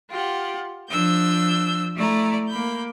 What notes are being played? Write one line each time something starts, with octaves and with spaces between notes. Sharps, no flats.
F4 G4 F#5
F3 D4 E6 G6
A3 E4 D5 A#5
A#3 B5 G6